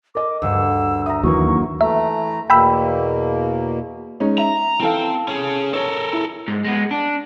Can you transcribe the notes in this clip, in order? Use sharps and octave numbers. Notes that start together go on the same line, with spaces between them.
A#4 D#5 D6
D2 G2 D3 E6
E5 A#5 D#6
D#2 E3 F#3 A#3 C#6
E3 A3 E5 A#5
E2 B2 A#3 G5 B5 E6
G#3 C#4 D#4
E5 A#5
E3 C4 A4 F5
C#4 G#4
A4 A#4 C#5
E4
G#2
G#3 B3
D4